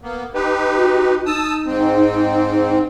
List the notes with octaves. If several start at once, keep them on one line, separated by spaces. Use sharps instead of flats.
A#3 B3
D#4 G4 B4
F#4
D#4 A5 D#6 E6
G#2 C4